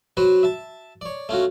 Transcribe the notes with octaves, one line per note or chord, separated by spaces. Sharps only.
F#3 F#4 B4 C5
E5 A5
C#5 D5
A3 C#4 F4 F#4